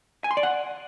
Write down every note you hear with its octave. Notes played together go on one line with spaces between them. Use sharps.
G#5
C6
D5
F#5